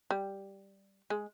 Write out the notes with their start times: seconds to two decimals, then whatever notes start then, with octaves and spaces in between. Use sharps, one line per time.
0.11 G3
1.10 G#3